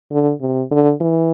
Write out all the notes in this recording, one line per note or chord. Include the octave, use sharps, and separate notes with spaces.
D3
C3
D3
E3